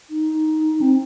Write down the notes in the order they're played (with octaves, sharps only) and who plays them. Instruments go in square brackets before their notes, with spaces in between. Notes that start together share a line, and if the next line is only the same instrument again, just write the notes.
[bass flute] D#4
C4